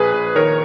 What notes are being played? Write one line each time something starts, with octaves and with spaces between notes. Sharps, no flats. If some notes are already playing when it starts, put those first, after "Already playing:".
Already playing: A#1 G#4 B4
A#1
D#3 A#4 C#5